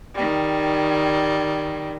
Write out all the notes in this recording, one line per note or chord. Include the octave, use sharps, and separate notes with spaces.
D#3 G3